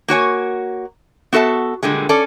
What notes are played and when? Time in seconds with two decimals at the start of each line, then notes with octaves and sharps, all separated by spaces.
0.08 A#3 F#4 C#5 G#5
1.33 B3 F#4 A4 E5 A5
1.83 A#2 D3 G3 G#3
2.09 C#4 A4 D5